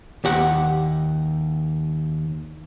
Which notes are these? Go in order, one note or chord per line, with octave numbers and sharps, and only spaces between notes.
D#2 G4 F#5